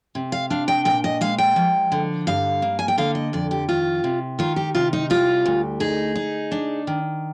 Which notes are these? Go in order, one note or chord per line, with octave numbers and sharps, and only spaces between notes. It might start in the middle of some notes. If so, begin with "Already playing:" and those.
C3
F5
D4 F5
G5
A#2 G5
D#5
G#3 F5
G5
F3
D3
G2 F5
A#3
G#5
G5
D3 F5
D#5
F2 D5
G4
D#3 F4
C3
D#3 F4
G4
C3 F4
D#4
G3 F4
D2
D#4 G#4
D#4
D4
D#3